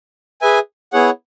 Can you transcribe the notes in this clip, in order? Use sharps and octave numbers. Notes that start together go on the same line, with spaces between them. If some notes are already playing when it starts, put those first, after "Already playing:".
G#4 B4 E5 G#5
B3 E4 G#4 C#5 F#5